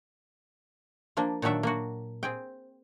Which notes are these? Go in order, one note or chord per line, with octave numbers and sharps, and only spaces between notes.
F3 A#3 D4
A#2 D#3 F#3 D4 E5 F#5
A#3 D4 F#4
C4 G#4 G5